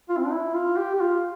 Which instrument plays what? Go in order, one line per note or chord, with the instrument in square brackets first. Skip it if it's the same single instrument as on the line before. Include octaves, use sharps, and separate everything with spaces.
[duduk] F4
C4
D4
E4
F4
G4
G4
F4